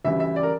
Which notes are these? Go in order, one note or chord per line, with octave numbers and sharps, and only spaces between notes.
D2 C#3 E3 G3 E5
E5
D5
A#4